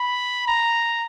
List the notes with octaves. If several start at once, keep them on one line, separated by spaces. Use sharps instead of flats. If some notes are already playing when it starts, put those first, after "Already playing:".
Already playing: B5
A#5